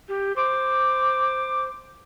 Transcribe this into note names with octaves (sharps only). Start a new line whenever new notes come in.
G4
C5 D6